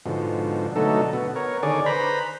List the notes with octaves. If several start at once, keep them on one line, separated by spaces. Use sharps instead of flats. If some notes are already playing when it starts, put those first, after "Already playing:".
G#2 B2 D3 F3
B2 D3 F#3 A3 D#4 A4
B2 B3
B3 A#4 C#5
D3 D#3 G#4 C#5 D5
B4 C5 A#5 B5